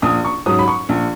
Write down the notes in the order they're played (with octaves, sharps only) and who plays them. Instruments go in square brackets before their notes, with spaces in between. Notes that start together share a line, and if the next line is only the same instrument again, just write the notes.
[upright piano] A#1 D#6
C#6
G#2 F#3 C#4 D#6
B5
C#6
A#1